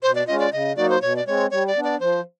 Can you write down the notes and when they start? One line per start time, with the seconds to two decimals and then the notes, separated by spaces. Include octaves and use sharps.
0.03 B2 C5
0.15 D5
0.27 G#3 C#4 F4 D#5
0.39 D5
0.53 C#3 D#5
0.76 F#3 A#3 D#4 F#4 D5
0.90 C5
1.01 B2 C#5
1.16 D5
1.26 G#3 C4 C#5
1.51 G3 C#5
1.67 D5
1.76 B3 D4
1.84 D5
2.00 F3 C5